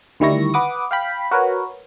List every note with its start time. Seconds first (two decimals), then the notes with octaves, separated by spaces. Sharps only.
0.20 D2 D#3 G3 E4 C#6 A#6
0.54 B4 F#5 D6 D#6
0.91 F5 G5 B5
1.31 F#4 A#4 B4 C#5